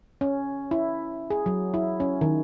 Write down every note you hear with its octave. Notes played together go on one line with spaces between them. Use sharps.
C#4
E4
G#4
F#3
E4
C#4
D#3